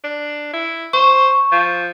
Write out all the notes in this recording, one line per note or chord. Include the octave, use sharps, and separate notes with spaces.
D4
E4
C5 C#6
F3